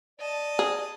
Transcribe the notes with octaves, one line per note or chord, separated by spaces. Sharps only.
D5 D#5 A5
G#4